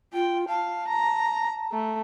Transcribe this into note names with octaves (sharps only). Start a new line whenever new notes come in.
F4 G5
F5 A5
A#5
A3